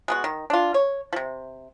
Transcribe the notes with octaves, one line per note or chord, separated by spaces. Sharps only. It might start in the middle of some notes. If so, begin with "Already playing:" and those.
G#3 B3 F#4
D#3
D4 F4
C#5
C3 F3